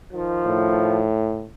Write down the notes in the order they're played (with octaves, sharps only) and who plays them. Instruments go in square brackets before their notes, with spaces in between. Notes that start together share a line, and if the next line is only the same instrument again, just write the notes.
[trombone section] D#3 F3
[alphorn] A2